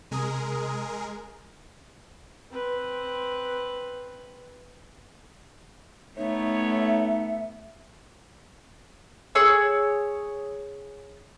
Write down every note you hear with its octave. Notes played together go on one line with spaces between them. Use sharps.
C3 G#3 G#4 A#4 D#6
C4 B4
A3 B3 D#4 C#5 E5
G#4 C#5 E6